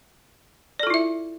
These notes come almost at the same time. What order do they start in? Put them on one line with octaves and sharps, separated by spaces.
D5 A4 F4 E4 E5